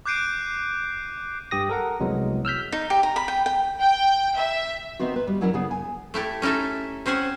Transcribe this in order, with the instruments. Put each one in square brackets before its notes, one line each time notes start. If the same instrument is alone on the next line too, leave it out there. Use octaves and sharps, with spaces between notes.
[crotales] D6 F#6 G6 C7 D7 D#7
[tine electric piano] G2 G4 D#6 A#6
A4 A#4 F#5
C2 F2 F#3 G#3 B3
E6 F6 G6 B6
[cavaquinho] D#4
G4
A#5
B5
G5
G5
[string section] G5
E5
[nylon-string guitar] D#3 B3 C4 F#4
B4
G3
E3 F#3 C#4 E4 A#4 F#5
C#3 B3 G#4
G#5
[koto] A3 E4 G4 A4
C#4 D#4 E4 A4 E5
C4 C#4 C5 F#5 G#5